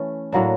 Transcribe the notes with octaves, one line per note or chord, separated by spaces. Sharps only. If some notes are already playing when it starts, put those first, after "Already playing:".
Already playing: E3 A3 C#4
A2 F#3 A#3 D4